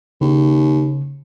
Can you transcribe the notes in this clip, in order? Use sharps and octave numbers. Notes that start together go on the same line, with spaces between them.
D#2 C#3